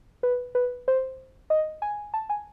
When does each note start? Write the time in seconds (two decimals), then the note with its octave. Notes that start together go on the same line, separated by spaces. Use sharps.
0.23 B4
0.55 B4
0.88 C5
1.50 D#5
1.82 G#5
2.14 A5
2.30 G#5